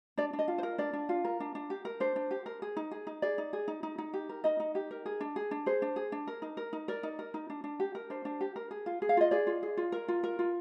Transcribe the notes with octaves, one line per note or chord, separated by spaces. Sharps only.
D4 D5
D4
D#5
F4
C5
A#4
D4 D5
D4
F4
A#4
D4
D4
G4
A#4
D4 C5
D4
G4
A#4
G#4
D#4
G#4
D#4
G#4 D5
D#4
G#4
D#4
D#4
D#4
G4
A#4
D#4 D#5
D#4
G4
A#4
G#4
D4
G#4
D4
G#4 C5
D4
G#4
D4
A#4
D#4
A#4
D#4
A#4 D5
D#4
A#4
D#4
D4
D4
G4
A#4
D4 C5
D4
G4
A#4
G#4
F4
G#4
F5
F4 D#5
G#4 D5
F4
G#4
F4
A#4
F4
A#4
F4